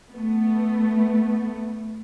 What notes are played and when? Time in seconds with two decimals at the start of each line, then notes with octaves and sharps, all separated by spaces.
0.10 A3 B3